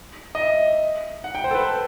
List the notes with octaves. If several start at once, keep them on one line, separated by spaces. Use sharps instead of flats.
D#5
E5
F#5
G5
C5
A4
B4